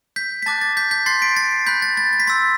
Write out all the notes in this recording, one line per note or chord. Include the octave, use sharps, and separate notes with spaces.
G6 B6
B6
A5 D6 F#6 A6
A6
G6 B6
G6 B6
C6 F#6 A6 C7
B6 D7
A6 C7
B5 F#6 G6 B6
A6
A6
A6
B6
C6 E6 G6 A6